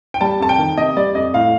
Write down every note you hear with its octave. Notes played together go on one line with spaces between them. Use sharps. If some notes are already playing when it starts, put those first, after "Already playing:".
G5
G3 A5
F2 A5
G5
D#3
C3 D#5
G3 D5
F2 D#5
A2 F5